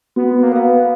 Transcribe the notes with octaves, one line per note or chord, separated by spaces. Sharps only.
B3 F#4
A#3
B3 B4 F5